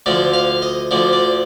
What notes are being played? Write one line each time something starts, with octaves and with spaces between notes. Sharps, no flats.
D2 D3 F3 D5
F5
D#5
D2 D3 F3 D5
D5